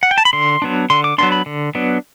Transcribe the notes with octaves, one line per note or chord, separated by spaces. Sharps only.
F#5
G5
A5
B5
D3 C6
F#3 B3 D4
D3 C6
D6
F#3 B3 D4 C6
B5
D3
F#3 B3 D4